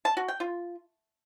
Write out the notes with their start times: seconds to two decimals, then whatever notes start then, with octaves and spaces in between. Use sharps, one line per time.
0.05 A5
0.17 F#4
0.28 G5
0.40 F4